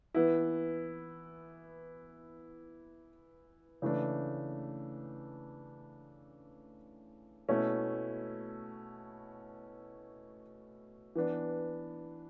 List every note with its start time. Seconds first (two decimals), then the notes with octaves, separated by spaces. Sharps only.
0.15 E3 B3 E4
3.82 C#3 E3 A3 D4
7.49 B2 A3 C#4 E4
11.16 E3 B3 D4